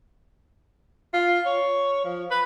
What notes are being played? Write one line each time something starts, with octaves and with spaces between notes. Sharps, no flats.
F4
C#5
F3
B4